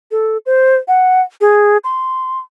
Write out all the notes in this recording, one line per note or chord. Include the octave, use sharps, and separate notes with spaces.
A4
C5
F#5
G#4
C6